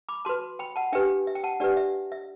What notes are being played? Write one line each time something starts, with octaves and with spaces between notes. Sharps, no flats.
B5 D6
F#4 B4 A5 C6
G5 B5
F#5 A5
D4 G4 B4 E5 G5
E5
G5
F#5 A5
D4 G4 B4 D5 F#5
E5
E5